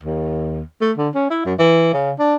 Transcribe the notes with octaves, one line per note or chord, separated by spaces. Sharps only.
D#2
A3
D3
C#4
E4
F#2
E3
C#3
D4